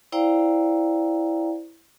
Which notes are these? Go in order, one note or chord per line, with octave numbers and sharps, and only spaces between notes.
E4 C5 D5 F5 G5 A#5